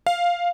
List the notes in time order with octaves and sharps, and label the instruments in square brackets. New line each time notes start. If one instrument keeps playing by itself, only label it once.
[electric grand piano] F5